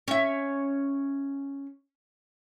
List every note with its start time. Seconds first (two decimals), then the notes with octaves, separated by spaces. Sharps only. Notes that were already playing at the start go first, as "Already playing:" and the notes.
0.08 C#4 E5